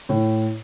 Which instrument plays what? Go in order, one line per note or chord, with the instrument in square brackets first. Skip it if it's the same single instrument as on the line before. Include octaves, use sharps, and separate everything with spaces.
[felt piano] A2